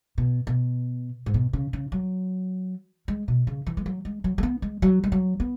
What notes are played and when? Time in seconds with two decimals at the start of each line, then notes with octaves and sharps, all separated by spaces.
0.18 B2
0.47 B2
1.26 G#2
1.34 B2
1.53 C#3
1.73 C#3
1.92 F#3
3.08 G#3
3.28 B2
3.47 C#3
3.67 E3
3.77 G#3
3.86 F#3
4.05 G#3
4.24 F#3
4.38 G#3
4.43 B3
4.62 G#3
4.82 F#3
5.04 G#3
5.12 F#3
5.40 B3